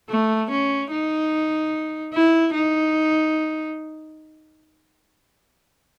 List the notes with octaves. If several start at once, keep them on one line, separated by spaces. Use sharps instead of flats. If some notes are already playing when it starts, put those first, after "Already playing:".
A3
C#4
D#4
E4
D#4